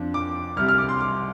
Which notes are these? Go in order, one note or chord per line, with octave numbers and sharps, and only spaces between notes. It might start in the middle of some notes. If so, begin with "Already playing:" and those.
Already playing: F2 F3 D4
D6
C2 C3 G3 F6
F6
D6
C6
D6